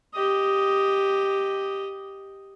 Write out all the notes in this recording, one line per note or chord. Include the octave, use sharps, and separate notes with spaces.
G4 D#5